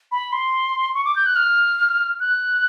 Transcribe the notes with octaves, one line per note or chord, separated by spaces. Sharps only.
B5
C6
C#6
D6
G6
F#6
F6
F#6